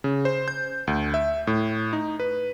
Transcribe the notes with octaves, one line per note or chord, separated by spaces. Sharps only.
C#3
C5
G6
D2
E5
A2
D#4
B4